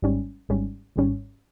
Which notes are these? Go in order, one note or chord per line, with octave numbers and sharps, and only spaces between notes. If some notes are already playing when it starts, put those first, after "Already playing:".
G#1 G#2 G3 C#4
G#1 G#2 G3 C#4
G#1 G#2 G3 C#4